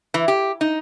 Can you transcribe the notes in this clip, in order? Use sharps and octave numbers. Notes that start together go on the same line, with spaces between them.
E3
G4
D#4